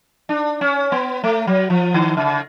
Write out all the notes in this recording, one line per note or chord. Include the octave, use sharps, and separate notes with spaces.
D4
C#4
B3
A3
F#3
F3
D#3
C#3